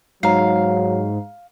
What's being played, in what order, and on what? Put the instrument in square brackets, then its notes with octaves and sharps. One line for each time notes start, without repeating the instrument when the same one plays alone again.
[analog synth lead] G#2 [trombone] F#3 [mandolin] F5 [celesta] A#5 C7